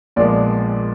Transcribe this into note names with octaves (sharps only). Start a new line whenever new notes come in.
A#1 A#2 F3 G#3 B3 D5